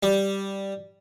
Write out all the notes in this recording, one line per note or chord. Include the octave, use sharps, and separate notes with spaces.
G3